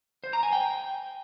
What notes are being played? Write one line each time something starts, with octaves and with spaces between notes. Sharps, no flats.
C5
A#5
G#5
G5